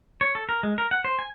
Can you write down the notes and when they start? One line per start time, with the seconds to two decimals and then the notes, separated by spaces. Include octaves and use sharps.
0.21 C#5
0.35 A4
0.49 A#4
0.63 G#3
0.78 A#4
0.91 F#5
1.04 C5
1.19 G#5